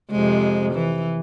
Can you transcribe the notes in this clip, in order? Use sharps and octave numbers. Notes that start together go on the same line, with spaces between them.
F2 C3 G#3
E3